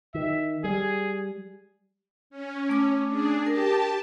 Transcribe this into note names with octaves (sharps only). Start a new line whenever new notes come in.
D#3 E5
G3 G#4
C#4
A3 D6
D4 G#4
G4 A#4 A5